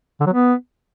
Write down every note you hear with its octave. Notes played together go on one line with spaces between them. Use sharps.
D3
F#3
B3